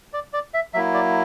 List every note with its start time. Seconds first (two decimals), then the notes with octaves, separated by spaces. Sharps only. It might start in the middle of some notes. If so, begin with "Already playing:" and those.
0.13 D5
0.33 D5
0.54 E5
0.74 F#3 A#3 E4 E5
0.94 D5